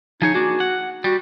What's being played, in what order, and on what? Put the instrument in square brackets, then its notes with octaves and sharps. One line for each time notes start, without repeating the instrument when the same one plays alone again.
[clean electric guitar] F3 G#4 C#5 [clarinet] D#4
[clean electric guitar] A#3 D4 G#4 [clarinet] F#4
[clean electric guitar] F#5
[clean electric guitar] G3 [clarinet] F#4